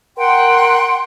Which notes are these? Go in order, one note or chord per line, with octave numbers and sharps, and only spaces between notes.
A#4 F#5 G5 C6